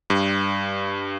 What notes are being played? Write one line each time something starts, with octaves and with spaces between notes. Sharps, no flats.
G2